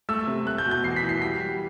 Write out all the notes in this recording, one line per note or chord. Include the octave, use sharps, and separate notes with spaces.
A3 E6
C3
A3 F#6
G6
B2
G6
E2 C7
B6
E3
C7
G3 B6
G3